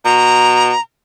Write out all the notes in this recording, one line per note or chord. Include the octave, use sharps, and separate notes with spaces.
B2 A#5